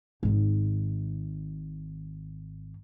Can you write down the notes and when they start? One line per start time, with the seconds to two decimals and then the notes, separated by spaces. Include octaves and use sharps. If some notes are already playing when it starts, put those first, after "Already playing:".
0.23 G#1 D#3